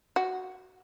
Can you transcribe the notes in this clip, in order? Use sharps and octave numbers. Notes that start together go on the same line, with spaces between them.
F#4